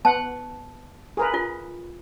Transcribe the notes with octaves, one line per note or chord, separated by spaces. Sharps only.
B3 F#5 A5
G#4 A#4 B4
F4